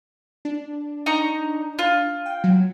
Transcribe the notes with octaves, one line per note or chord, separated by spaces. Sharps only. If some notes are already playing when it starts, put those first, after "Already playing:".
D4
D#4 A#5 C#6
F4
G5
F#3